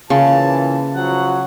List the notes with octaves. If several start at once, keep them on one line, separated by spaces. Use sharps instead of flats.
A#2 C#3 E3 A5
F3 F#3 F#5